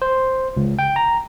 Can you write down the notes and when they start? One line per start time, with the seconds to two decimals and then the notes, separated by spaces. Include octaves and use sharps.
0.02 C5
0.57 C#2
0.79 G5
0.96 A#5